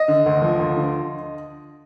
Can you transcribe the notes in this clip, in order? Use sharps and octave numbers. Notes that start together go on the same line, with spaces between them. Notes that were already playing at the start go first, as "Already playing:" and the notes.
Already playing: D#5
D3
D2
F3
D2
D3